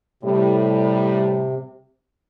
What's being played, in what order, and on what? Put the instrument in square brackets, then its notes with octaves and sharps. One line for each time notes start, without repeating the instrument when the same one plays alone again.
[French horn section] A2 G3 [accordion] C3